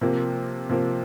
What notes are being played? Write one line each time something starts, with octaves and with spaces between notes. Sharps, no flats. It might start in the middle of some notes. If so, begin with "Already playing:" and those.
C3 F3 A#3
C3 F3 A#3